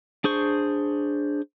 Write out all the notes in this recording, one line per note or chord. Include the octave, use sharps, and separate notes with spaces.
D4 G#4 C5 C#6